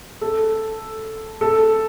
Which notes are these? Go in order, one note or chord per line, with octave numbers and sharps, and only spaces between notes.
A4
A4